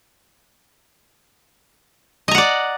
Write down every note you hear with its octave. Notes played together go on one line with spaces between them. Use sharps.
D5 D#5 F#5 A#5